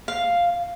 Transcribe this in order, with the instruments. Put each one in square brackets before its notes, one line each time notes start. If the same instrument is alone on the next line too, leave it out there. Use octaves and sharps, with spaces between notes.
[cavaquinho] F5